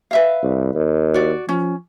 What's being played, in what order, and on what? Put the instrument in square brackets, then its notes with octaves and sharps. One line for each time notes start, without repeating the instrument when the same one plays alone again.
[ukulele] B4 E5 F5
[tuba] C2
D#2
[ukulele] F#4 D5
[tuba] F3 [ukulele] C#4